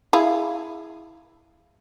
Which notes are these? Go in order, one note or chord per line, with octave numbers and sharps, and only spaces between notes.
E4 G#4 F5